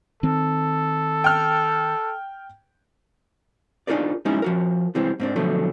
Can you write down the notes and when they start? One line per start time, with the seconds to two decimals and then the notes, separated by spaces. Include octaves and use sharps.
0.23 D#3 C4 A4
1.24 G5 F6
3.87 D4 D#4 F4 G#4 A#4 D5
4.25 G3 G#3 C#4 D#4 E4
4.42 F3 F#4 A#4
4.95 C3 E3 G3 G#3 C4
5.20 G#2 C4 D4
5.36 B2 D3 F3 F#3 A3